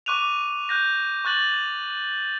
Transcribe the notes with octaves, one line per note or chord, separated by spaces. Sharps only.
C#6 D6 F#6 D#7 F7
F#6 G6 A#6
C#6 F#6 A6 F#7